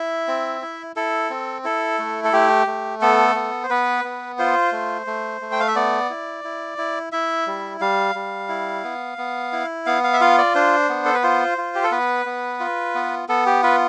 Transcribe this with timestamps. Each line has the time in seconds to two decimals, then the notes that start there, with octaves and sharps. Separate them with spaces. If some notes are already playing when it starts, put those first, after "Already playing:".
Already playing: E4 E5
0.28 C4
0.62 E4
0.96 E4 A4
1.30 C4
1.64 E4 A4
1.99 A3
2.24 A4
2.33 A3 G4
2.67 A3
3.01 B3 A4
3.35 B3
3.63 C5
3.70 B3 B4
4.04 B3
4.39 F4 C5
4.72 A3
5.07 A3
5.41 A3
5.52 G5
5.60 F5
5.68 E5
5.75 B3 D5
6.10 E4
6.44 E4
6.78 E4
7.12 E4 E5
7.47 G3
7.81 G3 F5
8.15 G3
8.49 E4
8.84 B3
9.18 B3
9.52 E4
9.86 B3 F5
10.04 F5
10.13 E5
10.21 F4 F5
10.38 D5
10.55 D4 C5
10.89 B3
11.05 A4
11.14 B4
11.23 F4 C5
11.58 F4
11.75 G4
11.84 A4
11.91 B3 B4
12.26 B3
12.60 F4
12.95 B3
13.29 B3 A4
13.46 G4
13.63 F4 B4